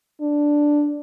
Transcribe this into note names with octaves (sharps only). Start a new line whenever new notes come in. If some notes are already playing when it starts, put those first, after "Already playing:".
D4